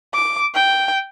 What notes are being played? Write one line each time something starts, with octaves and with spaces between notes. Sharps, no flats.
D6
G5